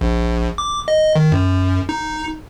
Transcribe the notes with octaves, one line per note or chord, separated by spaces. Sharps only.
A#1
D6
D#5
D#3
F#2
D#4